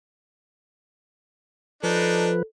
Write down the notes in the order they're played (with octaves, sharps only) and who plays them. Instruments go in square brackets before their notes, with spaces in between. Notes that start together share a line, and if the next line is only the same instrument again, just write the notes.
[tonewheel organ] F3 B4 [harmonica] D4 D#4 [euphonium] A4